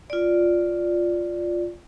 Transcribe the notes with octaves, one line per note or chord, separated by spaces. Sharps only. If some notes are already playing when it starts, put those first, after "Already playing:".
F4 D5